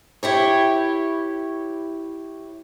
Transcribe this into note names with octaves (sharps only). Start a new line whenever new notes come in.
E4 G4 C#5